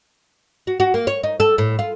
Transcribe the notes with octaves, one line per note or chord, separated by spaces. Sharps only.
F#4
F#4
A#3
C#5
D#4
A4
A2
F4